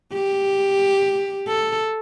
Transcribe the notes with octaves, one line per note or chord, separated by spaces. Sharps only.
G4
A4